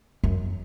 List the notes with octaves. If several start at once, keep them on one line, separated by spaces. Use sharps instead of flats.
F#2